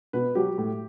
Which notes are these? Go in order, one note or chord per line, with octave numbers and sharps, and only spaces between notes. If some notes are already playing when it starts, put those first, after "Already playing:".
B2 B4
F#3 G4
A2